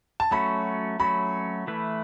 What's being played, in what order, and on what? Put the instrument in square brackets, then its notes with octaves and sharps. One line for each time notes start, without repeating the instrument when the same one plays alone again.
[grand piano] A5
[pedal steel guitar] F#3 A3 C#4 F#4 [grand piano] B5
[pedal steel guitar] F#3 A3 C#4 F#4 [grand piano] B5
[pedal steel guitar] E3 A3 E4 B4